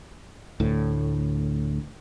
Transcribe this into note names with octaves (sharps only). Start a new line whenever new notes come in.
D2 A2